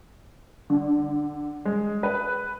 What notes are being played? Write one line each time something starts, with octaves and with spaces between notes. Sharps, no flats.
D3
G#3
B4